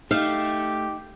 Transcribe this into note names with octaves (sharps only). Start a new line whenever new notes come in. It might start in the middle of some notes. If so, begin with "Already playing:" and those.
A3 D#4 G4 F5